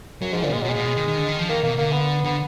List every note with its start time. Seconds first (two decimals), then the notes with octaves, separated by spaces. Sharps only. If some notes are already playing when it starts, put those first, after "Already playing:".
0.21 F#2 F#3
0.32 G#2 F3
0.43 A#2 D3
0.49 B2
0.53 A#2 G#3
0.62 B2 F#3
0.69 G#3
0.75 A#2
0.85 B2
0.96 D#3
1.07 D#3
1.18 D3
1.28 D#3
1.39 F3
1.49 D#3 A#3
1.63 B2 A#3
1.78 D3 A#3
1.92 B3
2.25 D3 B3